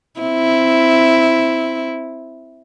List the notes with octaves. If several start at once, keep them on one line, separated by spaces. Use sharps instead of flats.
C4 E4